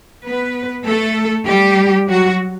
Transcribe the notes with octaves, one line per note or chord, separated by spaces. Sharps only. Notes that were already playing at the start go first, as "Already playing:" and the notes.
B3 B4
A3 A4
G3 G4
F#3 F#4